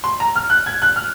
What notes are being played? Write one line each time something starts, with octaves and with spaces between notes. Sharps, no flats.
C6
A#5
F6
F#6
G#6
F#6
F6